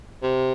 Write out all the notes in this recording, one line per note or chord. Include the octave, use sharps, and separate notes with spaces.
C3